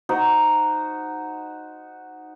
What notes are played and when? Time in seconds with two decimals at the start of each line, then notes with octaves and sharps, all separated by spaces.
0.09 D#4 F#4 C5